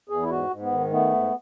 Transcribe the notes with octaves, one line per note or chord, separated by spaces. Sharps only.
E2 G#4
E4
G#2 F#4
G#2
B3
D#3
A3 B3
G#2